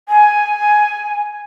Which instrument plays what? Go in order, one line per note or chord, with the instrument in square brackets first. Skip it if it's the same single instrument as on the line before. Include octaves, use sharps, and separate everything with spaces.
[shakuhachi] G#5